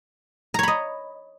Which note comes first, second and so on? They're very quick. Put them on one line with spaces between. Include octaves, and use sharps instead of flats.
A#5 C#5 B5 D#5